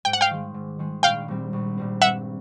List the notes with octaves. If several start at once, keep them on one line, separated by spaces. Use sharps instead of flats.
G#2 G5
F#5
F5 G5
D#3 G#3
G#2
D#3 G#3
A#1 F5 G5
A#2 G3 C4
A#1
A#2 G3 C4
G2 E5 F#5